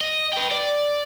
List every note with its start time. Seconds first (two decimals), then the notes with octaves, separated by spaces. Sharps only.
0.01 D#5
0.33 B4 G5
0.51 D5